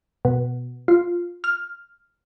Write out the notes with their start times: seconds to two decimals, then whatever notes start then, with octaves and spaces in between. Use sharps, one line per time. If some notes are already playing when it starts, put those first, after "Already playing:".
0.25 B2
0.88 F4
1.44 F6